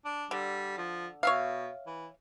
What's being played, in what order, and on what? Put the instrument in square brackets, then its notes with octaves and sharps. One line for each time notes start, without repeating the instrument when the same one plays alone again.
[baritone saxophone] D4
[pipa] D3 [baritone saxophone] G3
[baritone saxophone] F3
[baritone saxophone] B2 [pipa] C#5 E5 F5
[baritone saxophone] E3